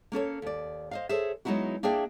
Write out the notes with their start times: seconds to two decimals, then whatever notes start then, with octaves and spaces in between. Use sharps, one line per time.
0.12 A#3 C#4 A4 C#5
0.42 D#2 D5
0.91 C5 D#5 F5
1.09 G#4 A4 C5 C#5 E5
1.45 F#3 G#3 B3 D#4 E4 F#4
1.83 A#3 D4 G#4 D5 E5 G5